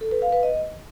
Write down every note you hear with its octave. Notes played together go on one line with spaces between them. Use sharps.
A4
B4
F5
B4
D#5